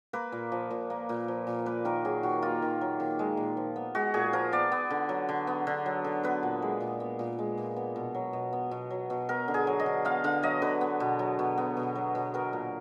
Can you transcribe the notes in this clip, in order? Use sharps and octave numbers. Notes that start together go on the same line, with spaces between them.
A#3 B4
A#2
F3
A#2
A#3
A#2
F3
A#2
A#3 B4
D#3 A#4
F#3 G#4
D#3 F#4
A#3 F4
D#3
F#3
D#3
G#3
A#2
F3
B3
G#3 F#4
A#2 G#4
F3 A#4
B3 D5
B3
D3
F#3
D3
B3
D3
F#3
D3
B3 B4
A#2
G#3
A#2
B3
A#2
G#3
A#2
B3
B2
F#3
B2
B3
B2
F#3
B2
B3 A#4
D3
G#4
F#3
D#5
D3
B3 F5
D3 F5
F#3 D#5
D3 B4
B3
B2
F#3
B2
B3
B2
F#3
B2
B3 A#4
A#2